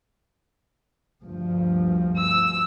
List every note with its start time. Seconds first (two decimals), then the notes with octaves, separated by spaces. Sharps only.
1.24 D2 G2 F3
2.17 E6